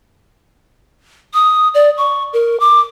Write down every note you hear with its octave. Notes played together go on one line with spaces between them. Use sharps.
D#6
D5
C#6
A#4
D6